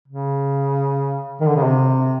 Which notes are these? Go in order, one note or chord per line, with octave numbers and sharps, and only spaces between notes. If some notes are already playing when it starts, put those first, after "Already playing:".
C#3
D#3
D3
C#3
C3